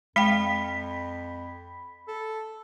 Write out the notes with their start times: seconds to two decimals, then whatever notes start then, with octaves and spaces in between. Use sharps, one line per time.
0.16 F2 G#3 F5 G5 B5 B6
2.08 A4